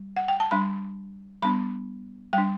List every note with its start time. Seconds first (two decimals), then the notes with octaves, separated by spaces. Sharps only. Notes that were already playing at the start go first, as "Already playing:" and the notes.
Already playing: G3
0.17 F#5
0.28 G5
0.40 A5
0.51 G3 D4 B5
1.42 G3 B3 D4 B5
2.33 G3 G5
2.38 D4